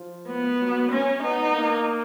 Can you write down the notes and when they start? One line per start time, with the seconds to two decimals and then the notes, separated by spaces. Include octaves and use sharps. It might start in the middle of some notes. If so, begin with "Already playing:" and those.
Already playing: F3
0.28 B3
0.60 F#3
0.92 C#4
1.23 B3 D#4
1.55 A#3